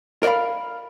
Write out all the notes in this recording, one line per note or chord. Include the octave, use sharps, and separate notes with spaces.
A#4 D5 D#5 F5 B5